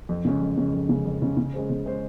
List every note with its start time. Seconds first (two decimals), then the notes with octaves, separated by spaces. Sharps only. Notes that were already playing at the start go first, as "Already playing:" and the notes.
0.09 F2
0.25 C#3 G#3 C#4
0.41 F2
0.57 C#3 G#3 C#4
0.73 F2
0.89 C#3 G#3 C#4
1.06 F2
1.22 C#3 G#3 C#4
1.37 C#3
1.53 G#3 C#4 G#4 C5
1.70 C#3
1.86 G#3 C#4 G#4 C5